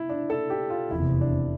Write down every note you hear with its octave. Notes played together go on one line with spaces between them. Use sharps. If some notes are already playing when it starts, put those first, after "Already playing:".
Already playing: E4
D4
A4
G4
F4
F1 E2 C3 E4
D4